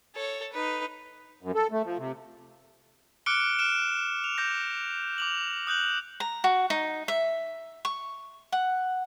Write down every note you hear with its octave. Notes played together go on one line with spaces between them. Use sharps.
A4 C#5
D#4 B4
F#2
A4
A3
F3
C3
D6 F6 F#6 C#7 D7 G7
F6 D7 E7
F7
D6 G6 A#6
D6 F7 F#7
D#6 F#6 G6 F#7
A#5
F#4
D#4
E5
C#6
F#5